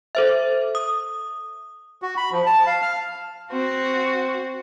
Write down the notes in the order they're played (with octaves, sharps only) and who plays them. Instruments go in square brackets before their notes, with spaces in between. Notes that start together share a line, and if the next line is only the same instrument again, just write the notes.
[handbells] A4 C5 E5
D#6
[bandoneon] F#4
B5
F3
A5
F5
F6
[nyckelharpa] C4 [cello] F#4